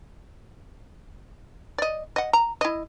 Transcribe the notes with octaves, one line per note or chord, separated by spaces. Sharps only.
D5 D#5
D#5 F#5
A#5
E4 D#5